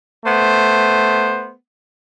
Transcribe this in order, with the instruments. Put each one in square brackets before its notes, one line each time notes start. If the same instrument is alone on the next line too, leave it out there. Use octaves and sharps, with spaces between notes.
[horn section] A3 B3 C5